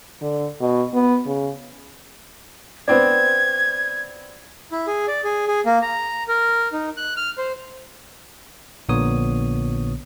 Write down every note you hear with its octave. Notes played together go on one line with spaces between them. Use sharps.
D3
B2
B3
C#3
B3 C4 D4 G#6
E4
G#4
D5
G#4
G#4
A#3
A#5
A#4
D#4
F#6
F6
C5
A#1 A#2 D3 B3 C#5 D#6